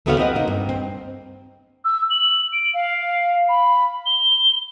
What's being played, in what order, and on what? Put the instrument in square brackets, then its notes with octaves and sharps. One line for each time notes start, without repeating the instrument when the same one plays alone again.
[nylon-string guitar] D2 A3 B3 F#4 C#5 F5
C4 B4 D#5 F#5
A#3 D#4
G2
C4
[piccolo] E6
F#7
D7
F5
B5
G7